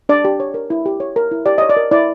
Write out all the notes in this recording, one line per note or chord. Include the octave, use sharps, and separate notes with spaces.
D4 D5
G4
C#5
A#4
E4
G4
C#5
A#4
E4
G4 D5
C#5 D#5
D5
A#4
E4 D5